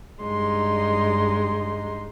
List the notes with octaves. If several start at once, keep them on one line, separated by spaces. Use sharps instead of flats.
G2 G#3 D#4 C6